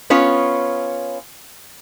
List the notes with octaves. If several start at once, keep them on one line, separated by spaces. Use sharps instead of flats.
B3 C#4 F4 C#5